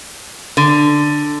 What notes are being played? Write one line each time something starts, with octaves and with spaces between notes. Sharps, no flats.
D3